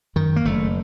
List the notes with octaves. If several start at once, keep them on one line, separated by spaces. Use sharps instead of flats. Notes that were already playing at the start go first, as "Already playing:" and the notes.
F#2 D#3
A#3
F#1 A3